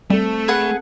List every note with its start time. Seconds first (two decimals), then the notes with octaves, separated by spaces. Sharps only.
0.10 G3 A3 C4 A4
0.48 G#4 B4 F#5